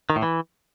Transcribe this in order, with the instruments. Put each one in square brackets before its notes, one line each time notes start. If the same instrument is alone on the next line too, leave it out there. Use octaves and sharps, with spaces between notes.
[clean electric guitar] D#3
A2
E3